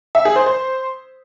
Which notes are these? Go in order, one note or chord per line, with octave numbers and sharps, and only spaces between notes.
E5
G#4
C5
C5